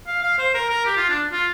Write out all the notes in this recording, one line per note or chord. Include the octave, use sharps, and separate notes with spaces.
F5
F5
C5
A#4
A#4
G4
F4
D4
F4